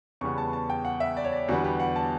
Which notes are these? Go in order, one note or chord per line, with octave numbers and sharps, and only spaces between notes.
E2 C#3 G3 B3 C#6
A5
A5
G5
F#5
E5
D5
C#5
D5
E2 D3 G3 B3 F#4
G4
F#5
A5